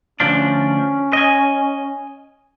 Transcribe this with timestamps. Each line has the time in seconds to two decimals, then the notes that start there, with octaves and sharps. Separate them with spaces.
0.20 D2 F3 C#4 D4
1.13 D#5 G#5